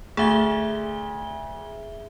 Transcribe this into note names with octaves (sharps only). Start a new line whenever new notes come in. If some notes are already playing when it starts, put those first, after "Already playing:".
D2 G#4 E5 G7